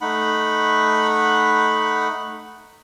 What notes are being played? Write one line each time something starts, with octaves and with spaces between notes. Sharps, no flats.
A3 D#4 F#5 B5